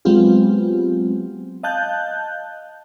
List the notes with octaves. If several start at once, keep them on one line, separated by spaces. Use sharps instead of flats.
F#3 G#3 B3 C4 F4 G4
D#5 F5 A5 F#6 G6